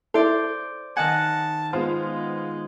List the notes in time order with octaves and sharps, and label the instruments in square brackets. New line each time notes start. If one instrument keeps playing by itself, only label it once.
[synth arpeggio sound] E4 A4 [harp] C5 D5
[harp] D#3 D#5 F#5 [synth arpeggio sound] G#5 [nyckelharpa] A5
[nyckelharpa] G#3 [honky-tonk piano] B3 F4 C5